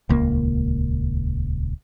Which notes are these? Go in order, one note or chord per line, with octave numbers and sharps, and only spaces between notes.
D#1 C#2 A#3